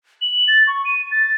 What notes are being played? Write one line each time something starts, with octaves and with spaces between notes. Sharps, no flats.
F#7
A6
C#6
D#7
A6